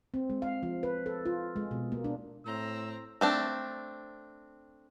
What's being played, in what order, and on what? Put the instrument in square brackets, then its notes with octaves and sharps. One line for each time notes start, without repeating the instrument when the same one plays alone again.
[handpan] C4
G#3
F5
F3
B4
A4
F4
G#3
B2
A#3
D4
[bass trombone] A2 [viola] C4 A#5 [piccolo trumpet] E6
[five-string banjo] A3 C4 D4